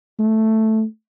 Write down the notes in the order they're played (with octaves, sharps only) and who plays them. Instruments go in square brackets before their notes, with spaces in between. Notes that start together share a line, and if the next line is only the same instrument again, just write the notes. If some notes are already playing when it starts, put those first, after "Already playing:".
[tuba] A3